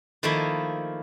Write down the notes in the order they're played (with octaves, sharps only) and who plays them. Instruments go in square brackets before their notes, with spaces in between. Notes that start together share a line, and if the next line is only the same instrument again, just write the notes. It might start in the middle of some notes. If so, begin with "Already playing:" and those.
[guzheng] D#3 F3 A3 A#3 D#4 E4